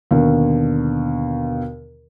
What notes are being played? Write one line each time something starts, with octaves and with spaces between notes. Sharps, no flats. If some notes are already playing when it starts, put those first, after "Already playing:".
D#2 B2 D3